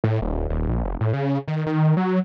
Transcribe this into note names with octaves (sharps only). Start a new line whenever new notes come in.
A2
D#1
D#1
A#1
F1
A2
C#3
D#3
D#3
F#3